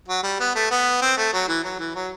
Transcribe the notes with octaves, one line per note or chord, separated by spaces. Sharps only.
F#3
G3
B3
A3
B3
C4
A3
F#3
E3
F#3
E3
F#3